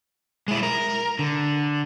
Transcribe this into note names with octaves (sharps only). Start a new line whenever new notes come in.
G#3 E4
A#4
D3